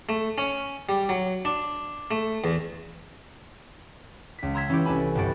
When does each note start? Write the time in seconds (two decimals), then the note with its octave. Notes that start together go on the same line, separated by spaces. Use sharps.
0.09 A3
0.38 C#4
0.89 G3
1.09 F#3
1.45 D4
2.11 A3
2.44 E2
4.39 C#2 B6
4.55 A#5 C6 E6 G#6 A#6 B6
4.69 E3 C#4 E4 F4 G4
4.85 C2 C#4 D4 A4 G#5 B5
5.15 G1 G2 G3 F#4 A6 D7